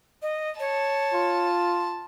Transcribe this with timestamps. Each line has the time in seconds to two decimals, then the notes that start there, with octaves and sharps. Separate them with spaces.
0.22 D#5
0.60 C#5 A5
1.13 F4